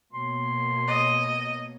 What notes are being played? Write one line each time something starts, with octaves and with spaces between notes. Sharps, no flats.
B2 A#3 C#5 C6
D#5